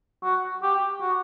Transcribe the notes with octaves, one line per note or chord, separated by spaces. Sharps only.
F#4
G4
F#4